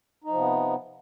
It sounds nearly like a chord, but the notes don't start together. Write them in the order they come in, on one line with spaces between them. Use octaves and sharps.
D#4 F3 C3 B3